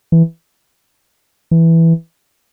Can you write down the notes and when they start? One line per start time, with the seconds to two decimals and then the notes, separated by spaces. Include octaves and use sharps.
0.12 E3
1.51 E3